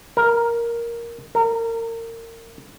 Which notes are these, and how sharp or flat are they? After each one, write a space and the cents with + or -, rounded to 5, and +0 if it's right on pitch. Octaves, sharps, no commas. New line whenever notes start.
A#4 +5
A#4 -30